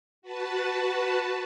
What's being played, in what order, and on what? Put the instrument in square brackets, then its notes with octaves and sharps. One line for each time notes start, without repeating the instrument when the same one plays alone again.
[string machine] F#4 B4 A5